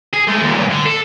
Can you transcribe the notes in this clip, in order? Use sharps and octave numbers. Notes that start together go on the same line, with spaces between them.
G#4
G#3 A3
D#2 A#2
C#2 G2
D3
A4